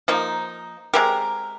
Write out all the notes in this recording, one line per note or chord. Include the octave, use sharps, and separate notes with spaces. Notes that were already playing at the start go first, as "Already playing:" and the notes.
F3 A#3 D#4
G#3 C4 G4 A#4